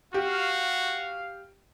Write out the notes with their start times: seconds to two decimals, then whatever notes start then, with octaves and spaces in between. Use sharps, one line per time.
0.14 F#4 G4 F5